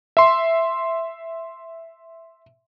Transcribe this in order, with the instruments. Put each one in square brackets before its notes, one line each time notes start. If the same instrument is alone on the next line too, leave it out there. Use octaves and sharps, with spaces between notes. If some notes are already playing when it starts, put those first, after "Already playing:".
[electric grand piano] E5 C6